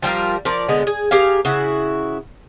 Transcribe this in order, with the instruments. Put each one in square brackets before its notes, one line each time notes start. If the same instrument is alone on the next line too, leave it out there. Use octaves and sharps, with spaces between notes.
[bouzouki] F3 G3 F4 A#4
F3 A#4 D5
D3 G#3 B3
G#4
G4 G#4 A#4 F5
C#3 E4 F#4